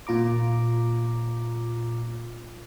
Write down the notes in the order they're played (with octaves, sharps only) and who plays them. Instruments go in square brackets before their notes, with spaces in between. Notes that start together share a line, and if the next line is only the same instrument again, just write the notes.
[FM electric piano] A#2 F4 A#5 D6